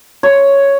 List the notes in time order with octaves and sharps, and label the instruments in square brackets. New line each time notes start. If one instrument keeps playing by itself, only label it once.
[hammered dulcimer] C#5